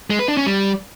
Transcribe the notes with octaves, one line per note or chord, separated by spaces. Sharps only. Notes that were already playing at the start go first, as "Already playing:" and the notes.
G#3
B4
D4
C#4
G3